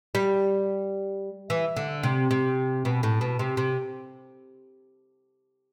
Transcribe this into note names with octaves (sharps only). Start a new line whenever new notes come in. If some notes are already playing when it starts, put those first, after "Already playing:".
G3
E3
D3
C3
C3
B2
A2
B2
C3
C3